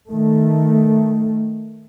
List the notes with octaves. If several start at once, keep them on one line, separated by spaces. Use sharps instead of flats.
D#3 A3